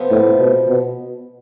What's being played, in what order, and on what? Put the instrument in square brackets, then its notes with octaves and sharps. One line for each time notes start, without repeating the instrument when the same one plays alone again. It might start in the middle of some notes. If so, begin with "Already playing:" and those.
Already playing: [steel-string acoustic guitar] C3 F3 B3
[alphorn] A2
B2
B2